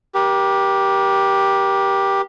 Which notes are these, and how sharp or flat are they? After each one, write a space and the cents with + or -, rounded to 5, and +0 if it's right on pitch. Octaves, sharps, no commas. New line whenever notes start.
G4 +0 A#4 +35